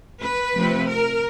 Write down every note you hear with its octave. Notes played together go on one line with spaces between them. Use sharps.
B4
C3 F3 A3 C4
A#4